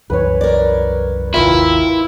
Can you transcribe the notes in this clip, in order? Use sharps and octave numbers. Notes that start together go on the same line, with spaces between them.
C2 F#2 E3 B4 C#5
A#4 D5
G#1 D#2 C3 E4 F4 A#4 B4